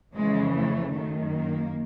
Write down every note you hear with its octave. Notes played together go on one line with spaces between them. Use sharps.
F2 C#3 E3 G#3
A3
F#2 D#3 A3
A#3